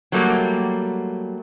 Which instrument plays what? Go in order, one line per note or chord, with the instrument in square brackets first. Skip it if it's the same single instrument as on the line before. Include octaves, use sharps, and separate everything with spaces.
[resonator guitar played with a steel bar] F#3 G3 A3 A#3